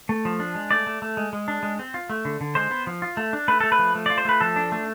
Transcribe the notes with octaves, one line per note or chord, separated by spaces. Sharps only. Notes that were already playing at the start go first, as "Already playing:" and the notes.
A3
F3
D4
G#3
A3 D5
A3
A3
G#3
G#3
D4
G#3
C4
F4
A3
D3
D3
G#3 C5
B3
F3
F4
A3
D4
A3 B4
A3 A4
B4
F3
A3
F4 D5
C5
A3 B4
F3 A4
D4
A3